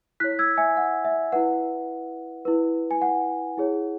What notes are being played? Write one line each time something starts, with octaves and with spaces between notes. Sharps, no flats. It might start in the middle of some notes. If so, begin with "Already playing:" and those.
E4 C#5 F#6 B6
E6 G#6
E5 G#5
F#5
E5
E4 B4 F#5
E4 B4
G#5
F#5
E4 G#4 C#5